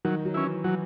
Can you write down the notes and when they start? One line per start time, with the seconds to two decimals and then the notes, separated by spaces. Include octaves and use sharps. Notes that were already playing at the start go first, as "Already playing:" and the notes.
0.05 D#3 F#3
0.25 F#3
0.34 E3 C#4 E4
0.64 E3 F#3